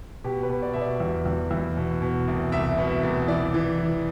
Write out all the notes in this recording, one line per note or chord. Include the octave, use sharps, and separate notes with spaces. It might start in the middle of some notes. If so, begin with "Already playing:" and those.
B2 G4
B4
B2
D5
B2 E5
D5
E2
E2
E2
B2
B2
C2
C2 E5
B2
C2
E3 D5
E3
E3